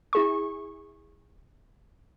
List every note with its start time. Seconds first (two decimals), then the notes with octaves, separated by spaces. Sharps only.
0.13 E4 G#4 C#6